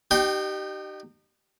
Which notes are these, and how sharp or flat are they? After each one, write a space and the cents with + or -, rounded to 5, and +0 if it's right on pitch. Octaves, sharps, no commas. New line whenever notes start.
D#4 -35 G4 -25 G5 +0